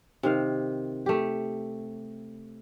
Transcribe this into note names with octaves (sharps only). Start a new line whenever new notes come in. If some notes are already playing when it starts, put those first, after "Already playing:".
C3 D#3 F5
A3 G4